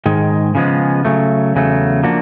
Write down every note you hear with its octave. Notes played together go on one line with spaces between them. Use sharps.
G#2 D#3 G#3
C#3 F3 G#3 B3
C#3 F#3 A3
E2 C#3 F#3 A3
F3 A#3 D4 F#4